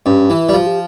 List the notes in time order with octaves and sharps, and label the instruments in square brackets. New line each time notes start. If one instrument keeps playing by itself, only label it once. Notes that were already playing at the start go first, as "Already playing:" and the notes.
[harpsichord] G2 [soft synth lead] C#4
[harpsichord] E3 [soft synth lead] E4
[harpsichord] G3
[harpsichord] F3 [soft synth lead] F4
[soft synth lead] G4